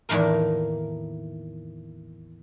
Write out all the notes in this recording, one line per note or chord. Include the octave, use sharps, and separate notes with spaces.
E2 A2 D#3 A#3 A#4